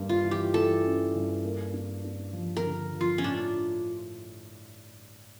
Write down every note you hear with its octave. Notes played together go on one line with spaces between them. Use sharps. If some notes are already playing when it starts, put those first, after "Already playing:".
Already playing: G2 A#3
F4
E3
G4
E3 A4
C#4
G2
A#3
D4
D4
F3
A#4
D3
F3
F4
C#4
A2 D4